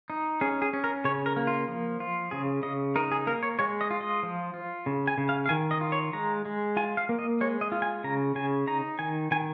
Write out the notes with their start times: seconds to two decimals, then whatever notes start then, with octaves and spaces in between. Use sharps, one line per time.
0.10 D#4
0.41 C#4 G#4
0.62 G#4
0.73 C#4
0.84 A#4
1.05 C#3 C#5
1.26 A#4
1.36 A#3
1.47 F4
1.68 F3
2.00 F4
2.31 C#3 G#4
2.63 C#3 D#5
2.96 D#4 A#4
3.12 G#4
3.27 A#3 A#4
3.43 C#5
3.59 G#3 C#5
3.81 D#5
3.91 F4
4.01 D#5
4.23 F3
4.54 F4
4.86 C#3
5.07 G#5
5.18 C#3
5.29 F5
5.46 F5
5.49 D#3 G#5
5.71 D#5
5.81 F4
5.92 C#5
6.13 G#3 A#5
6.45 G#3
6.76 F4 G#5
6.97 F5
7.09 A#3
7.19 D#5
7.41 G#3 C#5
7.61 D#5
7.72 F4
7.82 G#5
8.04 C#3 A#5
8.35 C#3 G#5
8.67 D#4 A#5
8.99 D#3 G#5
9.31 D#3 G#5